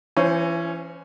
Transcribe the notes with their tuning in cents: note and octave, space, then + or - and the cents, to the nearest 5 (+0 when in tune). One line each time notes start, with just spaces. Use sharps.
E3 +35 C#4 +0 C5 +0